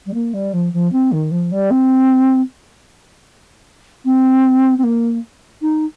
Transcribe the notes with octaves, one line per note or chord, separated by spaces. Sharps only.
G3
A#3
G3
F3
F3
C4
D#3
F3
G3
C4
C4
C4
A#3
D#4